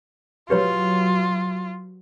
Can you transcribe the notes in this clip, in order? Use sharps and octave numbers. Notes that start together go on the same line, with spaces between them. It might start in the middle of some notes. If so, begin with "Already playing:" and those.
F#3 F4 G4 B4 C#5